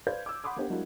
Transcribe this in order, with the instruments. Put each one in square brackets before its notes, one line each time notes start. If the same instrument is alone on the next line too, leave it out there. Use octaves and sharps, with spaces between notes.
[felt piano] B4 C5 D5 F5 G6 G#6
D6 E6
F#5 B5 C6 D6 D#6
A#3 B3 D4 G4 C5
F#3 G#3 A#3 D4 E4 F#4